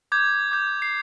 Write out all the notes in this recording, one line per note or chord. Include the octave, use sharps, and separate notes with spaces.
D6 G6 G#6
D6 G6
C7